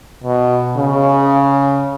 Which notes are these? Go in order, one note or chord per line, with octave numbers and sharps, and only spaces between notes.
B2
C#3